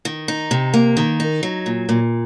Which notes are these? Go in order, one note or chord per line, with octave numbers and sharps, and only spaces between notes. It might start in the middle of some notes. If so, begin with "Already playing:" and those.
D#3
D#4
C3
A#3
D#3
D#4
F#3
A#2
A#2